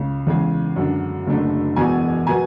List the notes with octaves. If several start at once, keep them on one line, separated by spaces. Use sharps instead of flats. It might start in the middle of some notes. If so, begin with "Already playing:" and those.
Already playing: C#2 C#3 G#3
E2 C#3 G#3
F#2 D3 G#3 D4
F#1 F#2 D3 A3 D4
E1 E2 B2 G#5
B2 F#3 B3 G#5